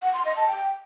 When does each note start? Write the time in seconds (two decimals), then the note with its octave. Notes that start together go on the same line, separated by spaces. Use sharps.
0.02 F#5
0.13 C6
0.25 D#5
0.36 A5
0.48 G5